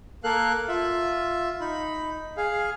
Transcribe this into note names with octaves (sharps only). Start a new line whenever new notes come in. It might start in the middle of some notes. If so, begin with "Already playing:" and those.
A#3 A4 A#4 F5 F#6
F4 E5
D#4 B5
G#4 F5